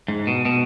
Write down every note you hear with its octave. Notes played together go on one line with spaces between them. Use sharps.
G#2
B2
B2